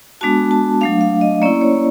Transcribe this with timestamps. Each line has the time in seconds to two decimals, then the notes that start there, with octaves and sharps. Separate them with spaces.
0.21 G#3 B3 D4 F#4 A5
0.51 A5
0.81 F#3 A3 D4 F5
1.01 F5
1.21 D#5
1.42 A#3 C#4 E4 D5
1.61 C#5